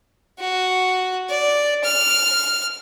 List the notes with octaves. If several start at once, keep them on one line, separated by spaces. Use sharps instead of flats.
F#4
D5
F6